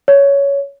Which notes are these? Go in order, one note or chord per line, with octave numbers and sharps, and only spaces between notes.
C#5